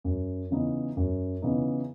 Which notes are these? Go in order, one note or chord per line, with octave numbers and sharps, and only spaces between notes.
F#2
C#3 E3 B3 D#4
F#2
C#3 E3 B3 D#4